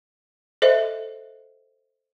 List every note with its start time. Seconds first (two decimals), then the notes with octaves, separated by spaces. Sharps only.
0.62 A4 C5 D#5 E5